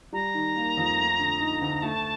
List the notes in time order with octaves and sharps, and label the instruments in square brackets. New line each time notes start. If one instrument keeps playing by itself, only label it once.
[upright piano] G3 [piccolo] A#5
[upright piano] D#3
A#3
F2
A3
D3
D#4
D2
[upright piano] A3 [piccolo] A5